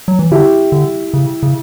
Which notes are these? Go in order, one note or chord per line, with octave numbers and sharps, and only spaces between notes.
F#3
E3
D3 E4 G4
D3
C#3
C#3